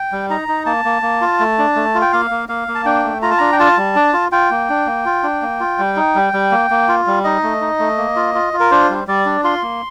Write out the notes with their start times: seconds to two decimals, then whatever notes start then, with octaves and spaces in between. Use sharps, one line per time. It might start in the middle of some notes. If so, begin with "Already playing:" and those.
Already playing: G5
0.12 G3
0.30 D#4 A#5
0.48 D#4
0.66 A#3 A5
0.85 A#3
1.02 A#3
1.21 F4
1.40 A3
1.58 D4
1.76 A3
1.95 F4
2.01 G5
2.12 A#3 F5
2.31 A#3
2.49 A#3 F5
2.68 A#3
2.75 A5
2.85 D4 G5
3.04 A3
3.22 F4 A#5
3.31 A5
3.38 D4 A#5
3.52 G5
3.59 F4 A5
3.77 G3
3.96 D4
4.13 F4
4.32 F4 G5
4.51 A#3
4.69 D4
4.86 A#3
5.06 F4
5.23 D4
5.42 A#3
5.60 F4
5.79 G3
5.96 D#4
6.15 G3
6.33 G3
6.52 A#3
6.70 A#3
6.88 F4
7.07 G3
7.24 D#4 D#5
7.43 A3
7.61 D#4
7.79 A3
7.98 A#3
8.16 F4
8.35 F4
8.53 F4
8.60 A#4
8.71 D4 C5
8.90 G3
9.07 G3 D5
9.25 D4
9.44 F4 C6
9.62 A#3